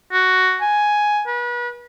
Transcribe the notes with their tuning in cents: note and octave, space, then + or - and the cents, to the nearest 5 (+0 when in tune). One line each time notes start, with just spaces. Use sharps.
F#4 +5
G#5 +5
B4 -35